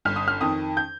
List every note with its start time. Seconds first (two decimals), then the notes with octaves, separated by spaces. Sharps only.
0.05 G1 F6
0.16 D#6
0.28 F6
0.41 F2 D#3 D#6
0.77 G6